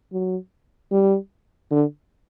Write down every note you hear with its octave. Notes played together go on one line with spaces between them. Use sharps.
F#3
G3
D3